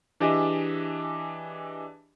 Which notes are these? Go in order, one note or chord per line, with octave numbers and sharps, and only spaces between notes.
E3 D4 G4 G#4 D#5 E5